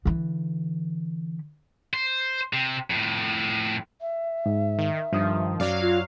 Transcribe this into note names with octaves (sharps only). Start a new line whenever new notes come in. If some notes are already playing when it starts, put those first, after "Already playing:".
D3 E3
C5
C3
F2 A2
E5
G#2
D#3
G2 D#3 F3 D#6
F#2 F#3 D5 F5
F4